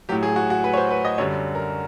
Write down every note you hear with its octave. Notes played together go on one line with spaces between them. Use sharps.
A2 F#3 G4
G#4
F#4
F#4
B4
C#5
C5
B4
D#5
F#2 D3 G3 C#5
A#4